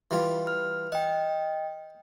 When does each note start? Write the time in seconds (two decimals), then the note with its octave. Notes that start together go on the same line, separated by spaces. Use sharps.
0.11 E3 G3 F4
0.47 F6
0.92 D#5 F#5 G5